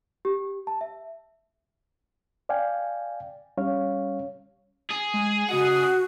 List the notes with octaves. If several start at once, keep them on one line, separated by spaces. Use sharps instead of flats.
G4
A5
E5
D5 F5 G5 G#5
G3 C#4 C#5 F5
G#4
G#3
C#3 F#4 D#5 F#5